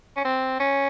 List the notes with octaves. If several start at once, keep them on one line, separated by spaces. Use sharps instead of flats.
C#4
C4
C#4